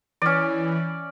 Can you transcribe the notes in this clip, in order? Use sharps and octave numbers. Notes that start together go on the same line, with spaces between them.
E3 C#4 D5